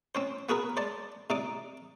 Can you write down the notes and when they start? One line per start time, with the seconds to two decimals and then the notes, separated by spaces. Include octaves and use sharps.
0.15 C4 C#4 C5
0.49 B3 F#4 G#4 A#4 B4
0.77 C5 D5 A5
1.30 C3 D#4 D5 D6